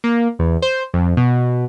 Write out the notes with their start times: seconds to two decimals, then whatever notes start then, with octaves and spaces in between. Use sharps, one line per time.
0.04 A#3
0.39 E2
0.62 C5
0.94 F2
1.17 B2